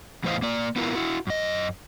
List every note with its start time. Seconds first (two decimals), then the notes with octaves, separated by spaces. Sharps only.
0.24 E2 A2 E3 C5 D#5 F5
0.42 A#3 D5
0.76 B3 E4 F4 A#4
0.95 E4 F#4
1.27 F#2 D#5